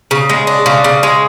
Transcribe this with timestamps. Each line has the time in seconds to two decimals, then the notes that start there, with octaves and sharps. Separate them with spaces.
0.11 C#3
0.29 G#3
0.47 D4
0.66 C#3
0.84 C#3
1.03 G#3